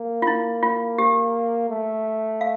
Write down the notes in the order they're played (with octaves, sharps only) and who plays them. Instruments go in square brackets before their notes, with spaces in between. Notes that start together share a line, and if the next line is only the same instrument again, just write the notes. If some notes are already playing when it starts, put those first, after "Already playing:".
Already playing: [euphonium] A#3
[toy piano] F4
E4
F4
G4
[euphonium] A3
[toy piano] F5